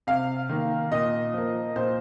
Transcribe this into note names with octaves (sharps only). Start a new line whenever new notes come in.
C3 F5
D#3 A#3
A#2 D#5
F3 A#3
A#2 C5